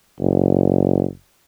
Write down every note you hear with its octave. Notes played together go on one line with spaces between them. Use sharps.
F#1